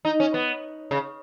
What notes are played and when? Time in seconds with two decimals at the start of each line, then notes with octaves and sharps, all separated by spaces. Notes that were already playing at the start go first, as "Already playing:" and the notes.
0.05 D#4
0.20 C#4
0.34 B3
0.91 C#3